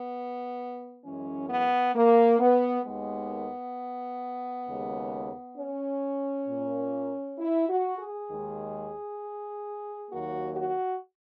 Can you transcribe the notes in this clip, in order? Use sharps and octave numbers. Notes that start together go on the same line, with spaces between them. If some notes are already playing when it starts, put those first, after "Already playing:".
Already playing: B3
F#2 E3 G#3 C#4
B3
A#3
B3
D#2 D#3 G#3 B3
D#2 C#3 G#3
C#4
A#2 A#3
E4
F#4
G#4
D#2 D#3 G#3
D#2 D#3 F#3 A#3 F#4
F#4